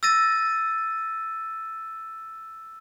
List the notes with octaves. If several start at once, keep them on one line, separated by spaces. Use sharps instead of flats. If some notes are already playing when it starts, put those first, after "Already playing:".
E6 A6 A#6 D#7